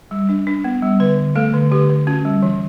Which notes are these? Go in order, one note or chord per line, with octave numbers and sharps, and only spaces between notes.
G3
D4
D4
B3
G3
D3 B4
D3
A3 A4
D3
D3 G4
D3
C#4 F#4
G3
E3